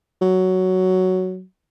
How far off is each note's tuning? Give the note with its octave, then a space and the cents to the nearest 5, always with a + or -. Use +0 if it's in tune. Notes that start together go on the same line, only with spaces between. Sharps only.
F#3 +5